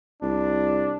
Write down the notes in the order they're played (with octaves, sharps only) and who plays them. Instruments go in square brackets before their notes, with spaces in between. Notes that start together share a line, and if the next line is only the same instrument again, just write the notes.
[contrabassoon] C2 [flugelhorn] D4